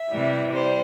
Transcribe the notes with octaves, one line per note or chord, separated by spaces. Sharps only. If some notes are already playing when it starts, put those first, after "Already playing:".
Already playing: E5
C3 E3 G3
G3 C5